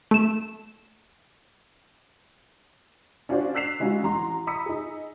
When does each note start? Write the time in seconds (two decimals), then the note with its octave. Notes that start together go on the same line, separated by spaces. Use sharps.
0.11 A3 E7
3.29 C#4 D4 F4 F#4 C5 D5
3.55 E6 F#6 B6 C7 E7 F7
3.80 G3 G#3 C#4 D#4 F4 F#4
4.03 A1 A#5 C6
4.47 A#5 B5 D#6 E6 B6 C#7
4.66 D#4 G#4